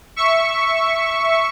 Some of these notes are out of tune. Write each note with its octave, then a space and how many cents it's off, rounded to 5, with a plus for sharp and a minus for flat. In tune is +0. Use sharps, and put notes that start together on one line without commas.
E5 +0 C#6 +0